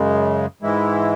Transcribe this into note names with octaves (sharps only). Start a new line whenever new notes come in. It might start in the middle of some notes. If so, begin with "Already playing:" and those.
Already playing: F#2 C#3 G#3
G#2 E3 G#3 E4